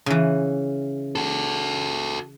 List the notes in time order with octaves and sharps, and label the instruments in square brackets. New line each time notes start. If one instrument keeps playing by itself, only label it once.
[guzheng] C#3 E3
[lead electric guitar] F#4 A4